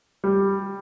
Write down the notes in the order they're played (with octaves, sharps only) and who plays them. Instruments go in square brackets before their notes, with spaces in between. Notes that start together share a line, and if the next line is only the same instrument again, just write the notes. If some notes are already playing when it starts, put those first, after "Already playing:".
[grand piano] G3